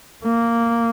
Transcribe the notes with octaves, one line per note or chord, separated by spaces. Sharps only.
A#3